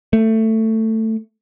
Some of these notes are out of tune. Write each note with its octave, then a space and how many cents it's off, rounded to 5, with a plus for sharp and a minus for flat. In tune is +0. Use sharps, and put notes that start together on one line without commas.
A3 +15